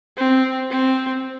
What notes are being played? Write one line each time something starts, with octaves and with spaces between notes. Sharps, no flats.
C4
C4